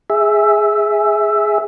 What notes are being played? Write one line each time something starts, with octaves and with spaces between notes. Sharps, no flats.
G#4 E5